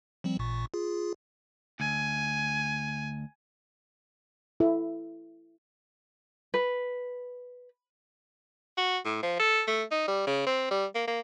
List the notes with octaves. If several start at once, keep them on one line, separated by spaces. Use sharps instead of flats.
F3 G3 C4
A1 A#2 C#6
F4 G#4
D2 G#5
E4 A4 E5
B4
F#4
A2
F3
A4
A3
D#4
G3
C#3
C4
G3
A#3
A#3